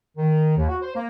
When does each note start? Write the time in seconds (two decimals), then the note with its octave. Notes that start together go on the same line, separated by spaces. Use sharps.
0.17 D#3
0.57 D#2
0.68 F#4
0.82 C5
0.95 A#3